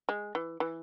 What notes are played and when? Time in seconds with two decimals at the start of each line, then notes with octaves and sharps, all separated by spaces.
0.09 G#3
0.35 E3
0.60 E3